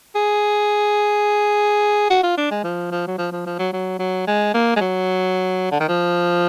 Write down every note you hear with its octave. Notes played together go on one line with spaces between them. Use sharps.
G#4
F#4
F4
D4
G#3
F3
F3
F#3
F3
F3
F3
F#3
F#3
F#3
G#3
A#3
G#3
F#3
D3
D#3
F3